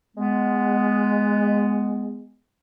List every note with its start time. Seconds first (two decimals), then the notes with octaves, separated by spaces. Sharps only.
0.16 G#3 B3